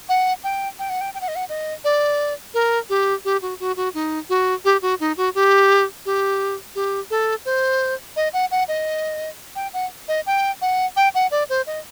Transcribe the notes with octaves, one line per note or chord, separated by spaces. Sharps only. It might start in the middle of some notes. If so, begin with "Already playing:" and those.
F#5
G5
G5
F#5
G5
G5
F#5
D#5
F#5
D#5
D5
A#4
G4
G4
F#4
F#4
F#4
D#4
F#4
G4
F#4
D#4
F#4
G4
G4
G4
A4
C5
D#5
F#5
F#5
D#5
G5
F#5
D#5
G5
F#5
G5
F#5
D5
C5
D#5